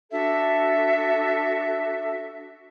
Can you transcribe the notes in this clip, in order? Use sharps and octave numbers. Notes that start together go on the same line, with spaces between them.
D4 F#4 A4 E5